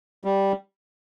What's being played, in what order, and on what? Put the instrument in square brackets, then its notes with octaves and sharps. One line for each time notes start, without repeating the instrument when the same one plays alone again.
[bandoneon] G3